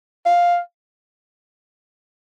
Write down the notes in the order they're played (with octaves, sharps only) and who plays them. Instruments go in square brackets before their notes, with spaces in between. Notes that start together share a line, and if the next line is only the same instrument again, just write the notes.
[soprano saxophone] F5